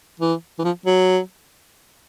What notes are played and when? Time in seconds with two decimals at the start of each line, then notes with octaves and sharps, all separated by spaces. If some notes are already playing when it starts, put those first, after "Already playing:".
0.20 E3
0.59 E3
0.64 F3
0.86 F#3